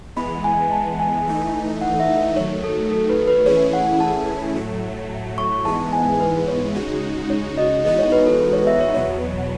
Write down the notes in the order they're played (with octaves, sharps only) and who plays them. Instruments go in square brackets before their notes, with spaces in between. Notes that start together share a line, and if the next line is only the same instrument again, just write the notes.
[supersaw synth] E3 G#3 B3 [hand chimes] B5
[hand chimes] G#5
A5
G#5
[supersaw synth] E3 A3 D#4
[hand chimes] F#5
E5
[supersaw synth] D#3 F#3 A3 [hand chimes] C#5
[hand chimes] A4
A4
B4
B4
[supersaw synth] E3 A3 C#4 E4 G#4 [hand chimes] C#5
[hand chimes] F#5
A5
[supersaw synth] A2 F#3 A3
[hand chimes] C#6
[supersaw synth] G#2 E3 G#3 B3 [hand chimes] A5
[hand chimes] G#5
B4
C#5
[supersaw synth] C#3 G#3 D#4 F#4
[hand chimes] C#5
D#5
[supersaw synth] E3 G#3 B3 D#4 F#4 [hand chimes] D#5
[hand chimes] C#5
B4
A4
B4
C#5
E5
C#5
[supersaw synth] E2 B2 F#3 B3 [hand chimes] C#5